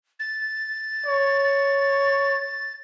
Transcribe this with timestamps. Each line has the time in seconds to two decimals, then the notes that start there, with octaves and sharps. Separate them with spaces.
0.20 A6
1.06 C#5